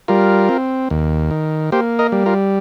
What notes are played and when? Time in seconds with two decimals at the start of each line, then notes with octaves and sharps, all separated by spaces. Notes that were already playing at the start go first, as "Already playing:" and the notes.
0.08 G3 F4 A#4
0.49 C4
0.90 D#2
1.31 D#3
1.72 A#3 G4 C5
1.99 A#4 D#5
2.12 G3
2.26 F4 A#4